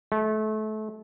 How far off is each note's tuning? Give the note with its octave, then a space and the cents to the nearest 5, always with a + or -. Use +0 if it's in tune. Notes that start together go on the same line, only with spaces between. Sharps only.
A3 -30